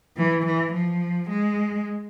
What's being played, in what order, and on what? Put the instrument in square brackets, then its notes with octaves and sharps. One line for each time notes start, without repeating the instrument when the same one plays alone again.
[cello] E3
E3
F3
G#3